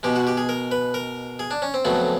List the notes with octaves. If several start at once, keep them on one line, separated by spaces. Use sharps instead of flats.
B2 G#3 G4
F#4
G4
G#4
A#4
B4
A#4
G#4
D4
C#4
C4
F2 C#3 F#3 A3 B3